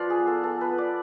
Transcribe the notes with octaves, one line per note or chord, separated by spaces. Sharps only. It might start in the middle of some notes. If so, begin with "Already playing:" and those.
Already playing: F3 F4 B4 D5
G#4
B3
A4
B3 A4
B4
B3
D5